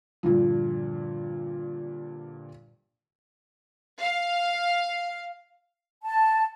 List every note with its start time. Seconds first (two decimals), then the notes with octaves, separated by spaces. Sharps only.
0.23 G2 A#2 D3 F3
4.01 F5
6.04 A5